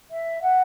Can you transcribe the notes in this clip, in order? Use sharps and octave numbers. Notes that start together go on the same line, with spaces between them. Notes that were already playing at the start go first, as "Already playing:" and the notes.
E5
F#5